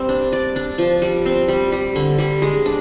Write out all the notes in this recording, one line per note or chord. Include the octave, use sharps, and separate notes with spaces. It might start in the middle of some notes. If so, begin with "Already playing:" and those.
Already playing: G3 C4
D4
D5
D4
F3
G3
C4
G3
G3
D3
G3
G#3
D4